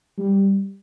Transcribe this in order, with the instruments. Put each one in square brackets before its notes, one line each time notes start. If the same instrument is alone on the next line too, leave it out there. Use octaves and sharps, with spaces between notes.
[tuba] G3